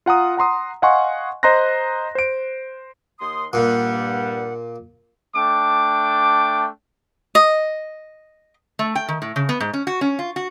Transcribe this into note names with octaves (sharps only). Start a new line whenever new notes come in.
F4 F#5 A#5 D#6
F#5 A#5 C6 D#6
D#5 F5 F#5 G#5 C6 C#6
C5 D#5 A#5 C6 F#6 A#6
C5 D7
D#2 C6 D#6
G2 A#2 G3 F#5
A3 D4 G5 D6
D#5
A3
G5
D#3
A2
C#3
B3
G#2
C#4
F#4
C#4
F4
F#4